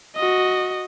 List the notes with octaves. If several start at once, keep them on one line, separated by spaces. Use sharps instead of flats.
F#4 D#5